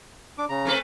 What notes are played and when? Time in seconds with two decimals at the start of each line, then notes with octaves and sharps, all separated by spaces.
0.38 D4 D6
0.49 C#3 A#5
0.65 A3 C4 B4